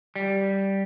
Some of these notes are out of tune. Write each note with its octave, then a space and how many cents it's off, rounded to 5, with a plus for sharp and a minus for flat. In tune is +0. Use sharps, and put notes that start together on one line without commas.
G3 -5